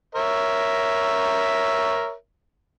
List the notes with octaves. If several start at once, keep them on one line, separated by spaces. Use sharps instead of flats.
A#4 C#5 E5